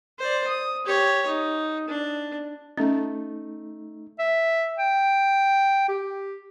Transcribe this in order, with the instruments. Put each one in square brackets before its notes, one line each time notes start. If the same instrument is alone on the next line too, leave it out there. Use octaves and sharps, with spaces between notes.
[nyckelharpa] C5 D5
D#6
G4 C#5
D#4
D4
[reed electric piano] A3 D#4 [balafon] C#4
[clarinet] E5
G5
G4